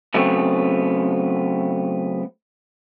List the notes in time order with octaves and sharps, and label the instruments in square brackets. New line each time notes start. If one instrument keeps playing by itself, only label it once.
[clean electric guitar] C#3 F#3 A3 B3 C4